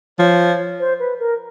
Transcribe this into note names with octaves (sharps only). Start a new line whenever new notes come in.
F3 C#5
C5
B4
A#4